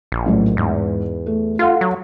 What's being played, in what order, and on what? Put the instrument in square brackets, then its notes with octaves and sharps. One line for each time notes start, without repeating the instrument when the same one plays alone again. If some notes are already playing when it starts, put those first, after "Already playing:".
[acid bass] A#1
[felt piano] A1 A2 F#3
[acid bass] E2 [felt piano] G#2
[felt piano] A3
[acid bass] F4 [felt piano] A4 F5 F#5
[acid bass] F#3